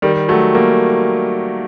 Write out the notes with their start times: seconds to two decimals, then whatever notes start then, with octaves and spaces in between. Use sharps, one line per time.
0.02 D#3 G3
0.29 F#3 A3
0.55 G3 A#3